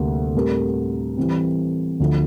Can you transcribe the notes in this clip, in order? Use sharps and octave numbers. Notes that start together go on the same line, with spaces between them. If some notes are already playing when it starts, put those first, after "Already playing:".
Already playing: D2 C3 G3 A#3
A2 G3 C4 G4 A#4
E3 G3 C4
D2 D3 F3